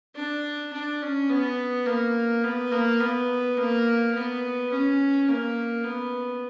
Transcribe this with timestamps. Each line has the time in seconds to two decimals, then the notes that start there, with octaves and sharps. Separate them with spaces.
0.15 D4
0.73 D4
1.02 C#4
1.29 B3
1.86 A#3
2.44 B3
2.72 A#3
3.00 B3
3.57 A#3
4.14 B3
4.71 C#4
5.28 A#3
5.84 B3